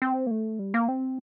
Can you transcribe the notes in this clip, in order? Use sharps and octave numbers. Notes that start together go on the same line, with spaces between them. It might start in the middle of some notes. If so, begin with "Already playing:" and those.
C4
A#3
A3
G3
A#3
C4